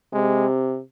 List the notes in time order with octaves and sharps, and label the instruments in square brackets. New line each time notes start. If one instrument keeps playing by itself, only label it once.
[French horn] C3 [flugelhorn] G#3